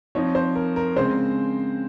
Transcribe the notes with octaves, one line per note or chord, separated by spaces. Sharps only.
F3 C4 D#4 C#5
C5
A#4
A#4
C#3 G#3 C4 C5